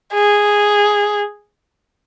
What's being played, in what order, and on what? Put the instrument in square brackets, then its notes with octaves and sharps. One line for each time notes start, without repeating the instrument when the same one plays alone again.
[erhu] G#4